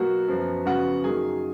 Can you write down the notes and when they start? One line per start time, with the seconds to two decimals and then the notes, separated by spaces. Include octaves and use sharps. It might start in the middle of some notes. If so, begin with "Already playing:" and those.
Already playing: B2 F#3 A#3 F#4
0.28 F#2 F3 B3
0.66 C#3 F3 B3 F#4 F#5
1.04 F#2 D#3 F#3 A#3 G#4 G#5